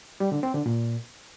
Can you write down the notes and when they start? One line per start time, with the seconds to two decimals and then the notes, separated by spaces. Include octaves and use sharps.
0.20 G3
0.32 D3
0.43 C4
0.54 D3
0.66 A#2